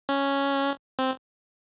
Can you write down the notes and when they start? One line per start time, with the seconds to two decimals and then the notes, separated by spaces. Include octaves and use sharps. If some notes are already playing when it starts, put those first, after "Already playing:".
0.09 C#4
0.99 C4